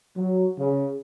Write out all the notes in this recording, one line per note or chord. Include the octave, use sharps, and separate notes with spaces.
F#3
C#3